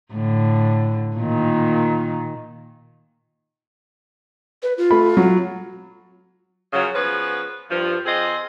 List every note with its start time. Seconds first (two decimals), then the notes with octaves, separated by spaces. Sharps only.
0.12 A2 D3
1.17 A#2 D#3
4.63 B4
4.78 F4
4.91 A3 B5
5.17 F#3
6.73 F#2 C#3 F3 F#3
6.94 F3 B3 C#4 G#4 B4
7.70 G2 F3
8.06 F3 C4 F4 G#4 D#5